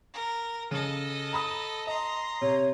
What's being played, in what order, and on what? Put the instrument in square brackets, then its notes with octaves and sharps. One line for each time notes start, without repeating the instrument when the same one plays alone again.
[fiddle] A#4
[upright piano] C#3 [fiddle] A4 D#5
[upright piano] A#5 B5 D#6
[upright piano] D#5 [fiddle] A#5 C6
[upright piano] C3 [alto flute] C#5